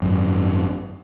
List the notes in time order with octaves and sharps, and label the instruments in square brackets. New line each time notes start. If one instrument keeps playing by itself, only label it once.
[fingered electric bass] G#1 F#2